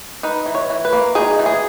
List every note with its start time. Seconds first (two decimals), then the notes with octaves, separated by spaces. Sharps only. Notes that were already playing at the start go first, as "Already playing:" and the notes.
0.23 D#4 B4
0.46 E3
0.55 C#5
0.70 E3
0.85 B4
0.93 A#3
1.15 D#4 G#4
1.39 E3
1.46 G#4